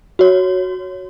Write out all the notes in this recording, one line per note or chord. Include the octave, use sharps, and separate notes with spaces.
F#4 C#5